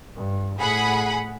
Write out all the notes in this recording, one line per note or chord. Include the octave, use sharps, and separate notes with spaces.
G2
A2 G#4 F#5 B5